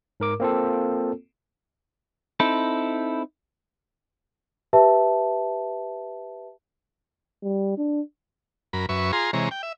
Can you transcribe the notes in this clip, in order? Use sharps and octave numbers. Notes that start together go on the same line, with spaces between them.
G#2 A#4 D6
A#3 C4 F4 A4
C4 D#4 E4 A4
G4 B4 E5 A5
G3
D4
F#2 A#4 B5
F#2 B4 E5 C#6
F4 G#4 A#5 C6
C3 E3 G#3 C#5 A#5
G5
E5